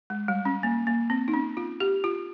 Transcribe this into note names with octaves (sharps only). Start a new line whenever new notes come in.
G#3
G3
C#4
A#3
A#3
C4
D#4
C#4
F4
G4
F4